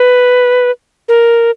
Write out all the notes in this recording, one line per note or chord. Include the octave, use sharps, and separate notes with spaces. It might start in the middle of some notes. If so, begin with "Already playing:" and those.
Already playing: B4
A#4